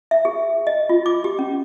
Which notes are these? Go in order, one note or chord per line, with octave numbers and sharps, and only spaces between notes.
E5
G#4
D#5
F4
D6
G4
C#4